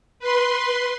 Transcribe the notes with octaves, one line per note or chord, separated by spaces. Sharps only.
B4 C6